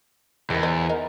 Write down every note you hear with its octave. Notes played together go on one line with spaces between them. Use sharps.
E2 D#3 F3 G3
B3 C5 D#5
B3 D#4 A#4